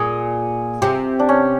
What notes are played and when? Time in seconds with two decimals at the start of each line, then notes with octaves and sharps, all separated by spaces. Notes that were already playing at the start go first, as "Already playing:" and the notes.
Already playing: A#2 G#4
0.82 C3 G4
1.19 D4
1.29 C#4